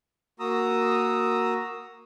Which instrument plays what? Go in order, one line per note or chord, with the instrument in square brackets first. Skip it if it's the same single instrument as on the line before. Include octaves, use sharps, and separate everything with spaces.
[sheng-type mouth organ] A#3 F#4 A#5 D#6 E6